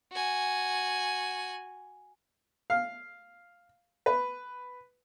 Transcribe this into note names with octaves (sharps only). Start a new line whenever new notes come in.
F#4 G#5
F5
B4